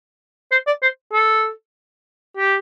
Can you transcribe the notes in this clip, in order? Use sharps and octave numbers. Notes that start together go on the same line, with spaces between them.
C5
D5
C5
A4
G4